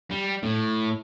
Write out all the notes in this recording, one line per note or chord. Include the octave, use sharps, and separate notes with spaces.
G3
A2